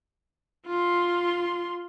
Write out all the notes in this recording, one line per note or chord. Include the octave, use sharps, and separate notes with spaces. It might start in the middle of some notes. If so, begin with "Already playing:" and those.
F4 C6